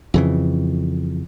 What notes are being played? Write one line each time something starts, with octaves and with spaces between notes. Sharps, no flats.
F2 C#3 E3